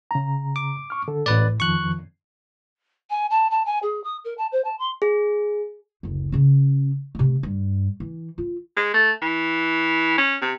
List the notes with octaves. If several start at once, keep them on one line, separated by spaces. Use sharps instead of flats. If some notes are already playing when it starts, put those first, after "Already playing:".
C#3 A#5
D6
C#6 F6
D3 A4
A1 A2 B4 D5
F2 D#3 F3 C#6 F#6
G#5
A5
A5
G#5
G#4
D#6
A#4
A5
C5
A5
C6
G#4
F#1 D2
C#3 C#4
C3 A3
G2
E3
F4
G#3
A3
E3
C#4
C3